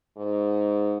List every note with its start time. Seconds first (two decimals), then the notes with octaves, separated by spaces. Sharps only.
0.17 G#2